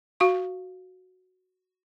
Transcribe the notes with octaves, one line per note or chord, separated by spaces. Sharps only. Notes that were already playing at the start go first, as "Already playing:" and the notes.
F#4 F5 C#6